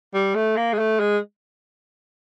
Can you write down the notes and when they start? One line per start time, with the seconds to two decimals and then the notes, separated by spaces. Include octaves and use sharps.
0.14 G3
0.35 A3
0.57 A#3
0.73 G#3
0.79 A3
1.00 G#3